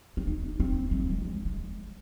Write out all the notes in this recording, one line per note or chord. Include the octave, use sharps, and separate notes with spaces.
C4
D#4
C4
G#3
A#3
G#3
F3
G#3